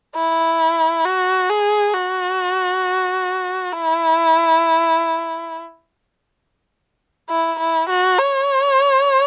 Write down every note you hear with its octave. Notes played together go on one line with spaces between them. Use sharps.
E4
F#4
G#4
F#4
E4
E4
E4
F#4
C#5